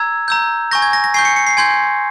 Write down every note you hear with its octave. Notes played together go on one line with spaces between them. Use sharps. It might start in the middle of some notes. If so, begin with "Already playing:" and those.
Already playing: A#5 E6 G#6
A#5 E6 G6
G#5 C#6 G6 A#6
G#6
A#6
A#6
G#5 C#6 G6 C7
C#7
C#7
C7
G#5 C6 G6 G#6